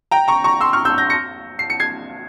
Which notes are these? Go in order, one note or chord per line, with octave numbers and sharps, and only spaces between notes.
G5 A#5
A#5 C#6
A#5 C#6
C6 E6
C#6 F6
E6 G6
G6 A#6
A#6 C#7
C7
C#7
G#6 C7